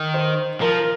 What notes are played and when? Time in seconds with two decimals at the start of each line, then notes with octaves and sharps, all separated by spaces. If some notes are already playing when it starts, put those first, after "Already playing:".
Already playing: D#3
0.14 C5
0.61 F3 A#4